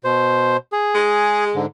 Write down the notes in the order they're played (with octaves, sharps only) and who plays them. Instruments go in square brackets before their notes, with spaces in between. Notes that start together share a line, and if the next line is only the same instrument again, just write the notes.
[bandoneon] B2 C5
G#4
[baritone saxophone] G#3
[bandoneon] G#2 D3